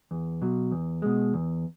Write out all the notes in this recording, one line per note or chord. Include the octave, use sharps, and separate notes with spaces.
E2
B2 F#3
E2
B2 G#3
E2